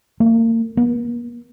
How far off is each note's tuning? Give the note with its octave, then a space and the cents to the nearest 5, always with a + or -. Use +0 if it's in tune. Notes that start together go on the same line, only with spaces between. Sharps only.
A#3 -35
A#3 +45